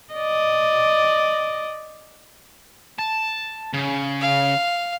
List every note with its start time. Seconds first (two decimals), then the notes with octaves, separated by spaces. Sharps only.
0.14 D5 D#5
2.98 A5
3.74 C#3
4.21 F5